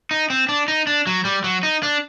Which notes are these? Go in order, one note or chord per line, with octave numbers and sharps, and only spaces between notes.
D#4
C4
D4
D#4
D4
F#3
G3
F#3
D#4
D4